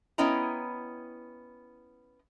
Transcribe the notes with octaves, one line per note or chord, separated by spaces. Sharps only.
B3 C#4 E4 D#5 G5 A#5